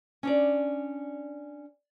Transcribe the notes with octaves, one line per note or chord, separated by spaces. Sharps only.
C#4 D4 D5